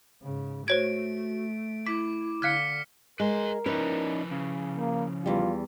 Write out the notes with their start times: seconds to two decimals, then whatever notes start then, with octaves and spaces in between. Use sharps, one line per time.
0.22 G#2 C#3
0.68 A3 F#4 C5 C#5 G#6 D7
1.87 E4 D6 B6
2.42 D3 F5 F6 F#6 G#6 B6 C#7
3.20 G#3 A#4 B4 C6
3.66 F3 C#4 D#4 E4 B4
4.31 C#3
4.77 A#3
5.26 E2 G3 F4